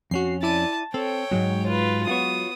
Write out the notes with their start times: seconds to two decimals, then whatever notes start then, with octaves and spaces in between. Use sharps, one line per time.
0.11 F2 C#4 F#4 C7
0.43 E4 D5 A5 D#7
0.94 C4 A4 C#5 G5
1.31 F2 G#2 F#3 G#3
1.66 F4 B4
2.07 B3 F4 F#4 C#5 D#6